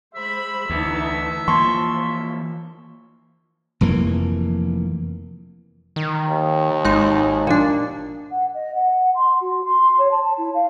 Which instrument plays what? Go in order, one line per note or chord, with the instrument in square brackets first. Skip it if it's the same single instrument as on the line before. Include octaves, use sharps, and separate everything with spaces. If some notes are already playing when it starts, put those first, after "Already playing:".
[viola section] G#3 C5 B5 [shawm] E5
[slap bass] D2 [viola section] E3 D#4 A5
[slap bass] E3 A#3 [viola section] F3 [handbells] A5 C6 C#6
[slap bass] F1 F2 E3 A#3
[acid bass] D#3
[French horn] D#2
[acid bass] G#1 [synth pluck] G#3 D#4
[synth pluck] A#2 F3 D4
[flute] F#5
D#5
F#5
C6
F#4
C6
C#5
A5
A5
E4
F5